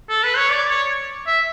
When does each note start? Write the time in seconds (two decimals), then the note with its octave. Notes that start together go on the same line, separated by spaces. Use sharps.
0.09 A4
0.23 B4
0.37 C#5
0.50 D5
0.69 C#5
1.27 E5